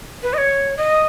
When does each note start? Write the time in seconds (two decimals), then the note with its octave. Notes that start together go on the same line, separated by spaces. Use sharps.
0.23 B4
0.34 D#5
0.38 C#5
0.77 D#5